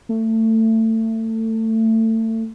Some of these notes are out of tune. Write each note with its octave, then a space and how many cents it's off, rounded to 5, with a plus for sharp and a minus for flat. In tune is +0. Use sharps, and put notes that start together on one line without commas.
A3 +25